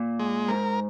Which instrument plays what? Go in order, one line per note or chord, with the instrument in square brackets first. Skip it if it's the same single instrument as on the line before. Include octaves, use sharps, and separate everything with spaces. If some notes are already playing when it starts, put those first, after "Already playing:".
Already playing: [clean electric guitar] A#2
[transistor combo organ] G#3
[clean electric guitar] G#2 [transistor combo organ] A#4